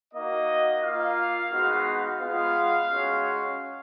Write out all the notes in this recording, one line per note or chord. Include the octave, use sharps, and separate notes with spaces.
A#3 D#4 F#4 D#5
A#3 F4 F5
G#3 B3 D#4 F#4
G#3 B3 F4 F5
G#3 C#4 F#4